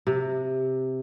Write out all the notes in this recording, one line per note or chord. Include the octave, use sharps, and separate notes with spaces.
C3